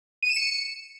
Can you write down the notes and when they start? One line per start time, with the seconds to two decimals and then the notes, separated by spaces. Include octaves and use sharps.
0.23 D#7
0.29 E7
0.36 C#7